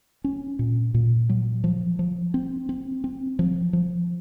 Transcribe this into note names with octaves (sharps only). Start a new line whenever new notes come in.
C#4
A#2
A#2
F#3
F3
F3
C4
C4
C4
F3
F3